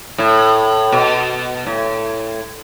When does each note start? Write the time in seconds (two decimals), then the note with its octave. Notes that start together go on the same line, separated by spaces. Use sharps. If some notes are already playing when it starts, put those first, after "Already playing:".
0.18 A2
0.92 B2
1.66 A2